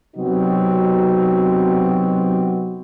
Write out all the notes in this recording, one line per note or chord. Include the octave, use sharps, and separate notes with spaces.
C3 F#3 B3 C4 D#4 F#4